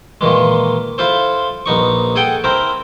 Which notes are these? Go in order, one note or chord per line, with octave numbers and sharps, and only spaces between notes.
A#2 D#3 E3 G#3
E4 F4 A4 C5
A#1 B3 D#4 C#6
G#4 A4 F#5 G5
C4 E4 A#4 C5